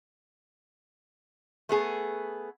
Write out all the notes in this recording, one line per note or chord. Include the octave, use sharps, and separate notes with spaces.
A3 B3 G#4